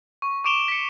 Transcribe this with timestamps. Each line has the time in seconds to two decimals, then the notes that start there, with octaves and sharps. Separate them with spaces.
0.22 C#6
0.44 C#6 D6 D7 E7 F7 G7
0.68 B6 C#7